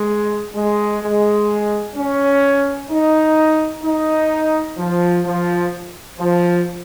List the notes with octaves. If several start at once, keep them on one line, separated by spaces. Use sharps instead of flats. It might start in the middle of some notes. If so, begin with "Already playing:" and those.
Already playing: G#3
G#3
G#3
C#4
D#4
D#4
F3
F3
F3